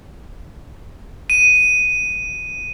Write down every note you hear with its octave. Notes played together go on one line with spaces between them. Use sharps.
D#7